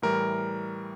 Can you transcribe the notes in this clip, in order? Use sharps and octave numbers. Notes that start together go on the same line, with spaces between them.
A2 E3 G3 A#4